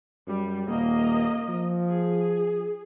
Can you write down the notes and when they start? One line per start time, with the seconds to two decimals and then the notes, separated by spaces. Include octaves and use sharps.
0.27 F#2 G3
0.67 D#1 A#3 D#5
1.48 F3
1.88 G#4